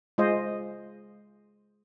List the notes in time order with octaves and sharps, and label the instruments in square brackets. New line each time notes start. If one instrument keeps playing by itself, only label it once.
[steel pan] G#3 F4 C5 D#5